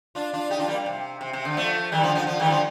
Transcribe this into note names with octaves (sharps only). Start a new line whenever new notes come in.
D4 F4
D4 F4
D#4 G4
D4 F4
G3 A#3
C3
C3
C3
D3
F3 A3
D#3 G3
D3 F3
D3 F3
D3 F3
D#3 G3
D3 F3